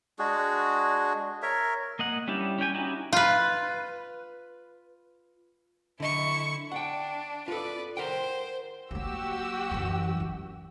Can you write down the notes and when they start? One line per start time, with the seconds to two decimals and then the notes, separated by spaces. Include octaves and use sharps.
0.19 G#3 D4 F#4 G#4
1.42 A#4 C#5 E5
1.99 A#3 D#5 F#5
2.27 G3 C#4 D4 E4 G4
2.58 C#4 D4 G5 G#5
2.74 C#4 D#4 E4 F#4 G4
3.13 F4 B4
6.00 D3 E4 D#5 C#6
6.72 D4 F#5 G5
7.48 F4 A4 B4 D5
7.97 A#4 C5 F#5 G5
8.91 F#3 A#3 F#4 G4 E6
9.71 F#2 E3
10.20 F#2